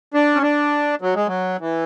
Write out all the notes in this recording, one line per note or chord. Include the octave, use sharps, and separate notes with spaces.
D4
C#4
D4
F#3
G#3
F#3
E3